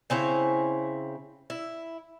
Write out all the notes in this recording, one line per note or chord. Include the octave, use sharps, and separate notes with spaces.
C#3 C4 E4 C#5
E4